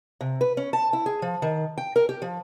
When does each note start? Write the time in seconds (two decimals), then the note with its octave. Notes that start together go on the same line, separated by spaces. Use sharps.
0.21 C3
0.41 B4
0.57 C#4
0.73 A5
0.93 E4
1.06 G#4
1.22 F3
1.42 D#3
1.78 G5
1.96 A#4
2.09 G4
2.22 F3